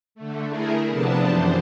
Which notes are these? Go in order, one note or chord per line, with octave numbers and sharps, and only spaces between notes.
D3 A3
A3 E4 G#4 A#4
C3 F3 B3 D4 A5
F#2 E3 C5